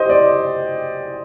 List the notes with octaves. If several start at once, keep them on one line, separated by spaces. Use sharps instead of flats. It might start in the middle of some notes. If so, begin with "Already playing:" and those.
Already playing: G4 C5 D#5
D5